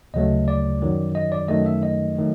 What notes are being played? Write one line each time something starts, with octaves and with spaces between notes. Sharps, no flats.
D2 C#3 F#3 A3 D#5
D5
F#2 D#3 F#3
D#5
D5
F#2 D#3 F#3 A3 D#5
E5
D#5
D#3 F#3 A3